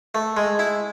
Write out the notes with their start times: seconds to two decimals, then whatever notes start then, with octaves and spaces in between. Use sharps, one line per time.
0.15 A3
0.37 G#3
0.59 E4